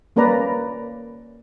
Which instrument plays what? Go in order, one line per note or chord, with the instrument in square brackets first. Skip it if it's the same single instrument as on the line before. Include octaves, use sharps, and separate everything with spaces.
[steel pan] G3 A#3 C#4 B4 D5 A#5